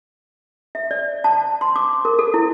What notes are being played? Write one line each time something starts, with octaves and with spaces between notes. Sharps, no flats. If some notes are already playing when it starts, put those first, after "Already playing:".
E5
D5
A5
C6
D6
A#4
A4
E4